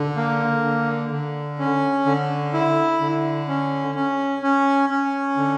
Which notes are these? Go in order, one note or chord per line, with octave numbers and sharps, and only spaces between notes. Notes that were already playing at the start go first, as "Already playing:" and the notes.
Already playing: D3
A#3
D3
D3
C#4
D3
E4
D3
C#4
C#4
C#4
C#4
D3